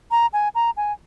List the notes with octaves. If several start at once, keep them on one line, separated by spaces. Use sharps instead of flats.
A#5
G#5
A#5
G#5